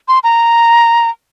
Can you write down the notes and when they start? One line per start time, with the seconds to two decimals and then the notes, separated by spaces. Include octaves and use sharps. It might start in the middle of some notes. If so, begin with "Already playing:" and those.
0.08 C6
0.24 A#5